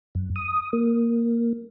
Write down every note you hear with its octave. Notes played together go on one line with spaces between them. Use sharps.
F#2
D#6
A#3